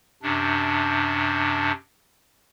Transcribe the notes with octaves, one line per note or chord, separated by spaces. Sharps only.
F#2 C3 D4